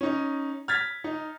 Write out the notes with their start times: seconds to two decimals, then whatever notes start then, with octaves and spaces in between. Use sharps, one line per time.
0.01 C#4 D#4
0.68 F6 G#6 A6 B6
1.04 D#4